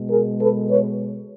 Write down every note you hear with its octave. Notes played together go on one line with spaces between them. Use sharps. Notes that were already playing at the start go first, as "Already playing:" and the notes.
Already playing: B2 G#3
G#4 A#4
A4 B4
B4 C#5